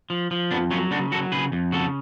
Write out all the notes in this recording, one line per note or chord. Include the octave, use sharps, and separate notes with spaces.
F3
F3
F2 B3 D4
F#3 C#4 F4
C#3 D4 F#4
F#3 F#4 A4
C#3 G#4 B4
F2
C#3 F#4 A4